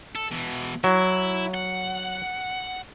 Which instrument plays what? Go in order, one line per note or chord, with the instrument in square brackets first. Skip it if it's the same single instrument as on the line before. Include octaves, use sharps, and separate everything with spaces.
[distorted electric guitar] A4
B2 E3
[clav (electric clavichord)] F#3 [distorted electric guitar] E4
[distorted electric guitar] F#5